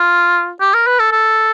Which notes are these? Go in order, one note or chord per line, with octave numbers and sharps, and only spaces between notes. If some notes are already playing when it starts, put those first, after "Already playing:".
Already playing: F4
G4
A#4
B4
A4
A4